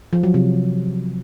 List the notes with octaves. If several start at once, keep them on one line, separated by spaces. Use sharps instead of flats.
F3
F#3
C3